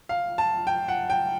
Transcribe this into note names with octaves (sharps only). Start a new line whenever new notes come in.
F5
A5
G5
F#5
G5